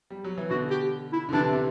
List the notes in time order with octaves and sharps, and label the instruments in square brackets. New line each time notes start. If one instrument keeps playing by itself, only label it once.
[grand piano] G3
F#3
E3
[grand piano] B2 D3 [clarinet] F#4
[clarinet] G4
E4
[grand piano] D3
[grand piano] C3 E3 [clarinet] D4
[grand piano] C3